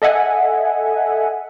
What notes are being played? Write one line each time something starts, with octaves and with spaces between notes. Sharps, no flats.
A4 D#5 E5 F#5 G#5